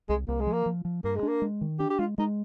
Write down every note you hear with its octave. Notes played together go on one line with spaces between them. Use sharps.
C2 G#3
C2 A#3
G#3
F3
A#3
F3
F3
G2 A#3
G#3
A#3 D4
G#3
D#3
D4 G4
G4
G#3 F4
G#3 D#4